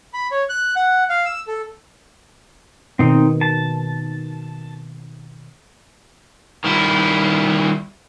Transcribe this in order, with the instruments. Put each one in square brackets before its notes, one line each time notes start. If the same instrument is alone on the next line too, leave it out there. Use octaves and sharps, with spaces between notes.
[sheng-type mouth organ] B5
C#5
F#6
F#5
F5
E6
A4
[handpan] B2 D#3 [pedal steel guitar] C4 D#4
[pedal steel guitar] A5
[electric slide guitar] D#3 G3 E4